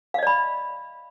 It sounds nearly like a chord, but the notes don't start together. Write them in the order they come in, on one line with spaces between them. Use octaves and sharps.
F5 D#5 D5 B5